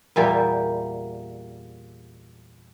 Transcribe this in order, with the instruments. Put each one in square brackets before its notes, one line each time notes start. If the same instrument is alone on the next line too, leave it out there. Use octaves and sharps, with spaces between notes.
[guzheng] E2 A#2 G3 A#3 G5